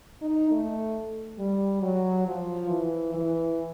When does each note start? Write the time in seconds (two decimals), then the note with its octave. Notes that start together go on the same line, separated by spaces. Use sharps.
0.22 D#4
0.51 A3
1.39 G3
1.82 F#3
2.26 F3
2.69 E3
3.14 E3